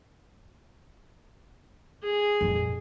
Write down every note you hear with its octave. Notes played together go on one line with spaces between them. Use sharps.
G#4
A#1 F2